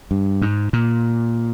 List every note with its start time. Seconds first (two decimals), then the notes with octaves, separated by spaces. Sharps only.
0.11 G2
0.42 G#2
0.73 A#2